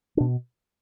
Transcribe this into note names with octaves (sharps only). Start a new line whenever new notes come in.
D4
B2